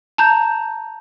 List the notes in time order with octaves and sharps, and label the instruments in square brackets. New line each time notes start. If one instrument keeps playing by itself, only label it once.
[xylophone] A5 A#5 G6